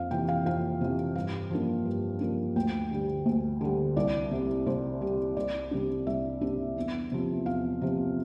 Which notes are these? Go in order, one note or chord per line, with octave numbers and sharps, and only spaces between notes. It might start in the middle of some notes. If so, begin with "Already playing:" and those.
Already playing: F2 F5
C3 E3 G5
F5
F2 F5
C3 E3
G2 F5
F3 A#3 D4
G2
F3 A#3 D4
D2 G5
D3 G3
D2
D3 G3
C2 D5
C3 G3
C2 C5
C3 G3
C2 D5
C3 G3 D4
C2 E5
C3 G3 D4
E2
C3 F3
E2 F5
C3 F3